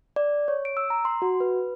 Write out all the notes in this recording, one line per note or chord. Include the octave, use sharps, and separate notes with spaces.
D5
C#5
D7
E6
A#5
C6
F#4
B4